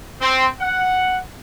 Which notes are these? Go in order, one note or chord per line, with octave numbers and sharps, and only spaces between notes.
C4
F#5